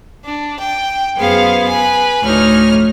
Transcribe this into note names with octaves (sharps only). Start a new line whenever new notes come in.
D4
G5
F#2 B3 G#4 C5 F5
B4 G#5
D2 A2 A3 D#4 C#5 F6